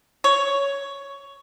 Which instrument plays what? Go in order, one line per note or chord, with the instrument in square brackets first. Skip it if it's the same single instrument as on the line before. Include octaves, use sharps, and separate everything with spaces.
[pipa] C#5